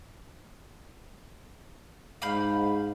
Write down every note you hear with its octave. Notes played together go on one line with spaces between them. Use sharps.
G#2 F5 B5 G6